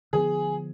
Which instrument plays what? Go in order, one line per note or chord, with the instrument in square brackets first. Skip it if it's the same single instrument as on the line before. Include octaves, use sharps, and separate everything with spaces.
[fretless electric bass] D3 F3 G#3 B3 [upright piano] G#4